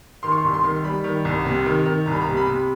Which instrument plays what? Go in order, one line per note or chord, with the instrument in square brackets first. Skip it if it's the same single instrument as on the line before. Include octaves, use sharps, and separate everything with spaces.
[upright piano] D#3 C6
C#6
C6
C2
C6
D#3
G3 B5
D#3
C2
C3
D#3
D#3
C2 A#5
B5
A#5
C3
B5
C3